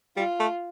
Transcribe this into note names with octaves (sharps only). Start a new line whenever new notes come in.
G3 F4
A3